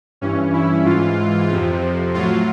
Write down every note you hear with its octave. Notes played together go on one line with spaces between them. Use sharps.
G2 E3 C#4
E4
G#2 E3 F4
F2 C3 F3
A2 F#3 F4